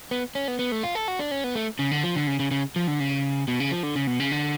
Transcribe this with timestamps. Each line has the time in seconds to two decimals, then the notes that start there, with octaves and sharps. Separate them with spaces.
0.11 B3
0.35 C#4
0.48 B3
0.59 B3
0.72 A3
0.83 F4
0.95 A4
1.08 F#4
1.19 D4
1.31 C#4
1.44 B3
1.55 A3
1.79 C#3
1.91 D3
2.03 F3
2.15 D3
2.27 C#3
2.40 C#3
2.51 C#3
2.76 F3
2.88 D3
3.00 C#3
3.48 B2
3.60 C#3
3.72 F3
3.83 D3
3.96 C#3
4.07 B2
4.20 C#3
4.32 D3